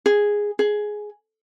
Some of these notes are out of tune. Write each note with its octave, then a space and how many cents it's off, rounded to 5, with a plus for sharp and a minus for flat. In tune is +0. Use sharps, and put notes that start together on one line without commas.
G#4 -5
G#4 +10